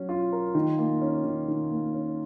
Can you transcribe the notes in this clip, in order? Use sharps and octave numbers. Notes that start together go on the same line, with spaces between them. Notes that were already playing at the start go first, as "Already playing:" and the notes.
Already playing: F#3 C#4
F4
A#4
D#3
A#3
C#4
D#3
D#3
A#3
C#4